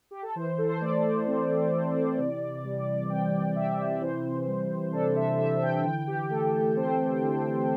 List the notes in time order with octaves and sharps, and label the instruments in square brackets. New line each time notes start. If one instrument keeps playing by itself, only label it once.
[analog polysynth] G4
A4
E3 C5
A4
C5
A3 D5
C4
E3
C3
G3
C4 G5
C3 E5
E3 C5
G3
D4 A4
E5
E3 E5
G5
D3 G5
G4
A3 A4
G4
C4 C5
D3